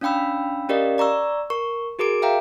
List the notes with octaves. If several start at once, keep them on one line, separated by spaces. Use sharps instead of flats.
C#4 D4 F5 G5 B5 E6
C#4 G4 A#4 D5 D#5 F5
D5 A#5 C#6 E6
A#4 C#6
F#4 G#4 A#4 D6 D7
E5 F5 G5 A#5